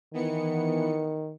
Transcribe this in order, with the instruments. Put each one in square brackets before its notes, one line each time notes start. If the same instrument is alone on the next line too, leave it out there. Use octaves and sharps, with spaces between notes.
[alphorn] D#3 [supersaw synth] E3 B3 C#7